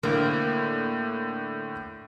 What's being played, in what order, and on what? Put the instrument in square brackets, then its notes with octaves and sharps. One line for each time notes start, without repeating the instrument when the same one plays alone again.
[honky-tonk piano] A2 D3 [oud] A#3